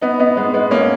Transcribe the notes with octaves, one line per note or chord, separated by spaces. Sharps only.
B3 D#4
B3 D#4
G#3 B3
G#3 B3
A#3 C#4